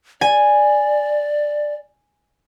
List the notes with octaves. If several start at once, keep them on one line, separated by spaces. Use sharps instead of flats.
D5 G#5